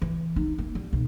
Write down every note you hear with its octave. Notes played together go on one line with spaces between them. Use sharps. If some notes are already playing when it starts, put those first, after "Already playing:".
E3
D#4
A#3
G3
B1